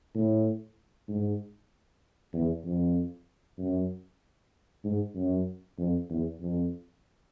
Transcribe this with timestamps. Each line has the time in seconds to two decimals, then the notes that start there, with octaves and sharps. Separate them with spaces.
0.15 A2
1.09 G#2
2.34 E2
2.65 F2
3.58 F#2
4.84 G#2
5.15 F#2
5.78 F2
6.09 E2
6.40 F2